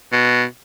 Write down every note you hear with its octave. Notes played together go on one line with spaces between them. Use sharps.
B2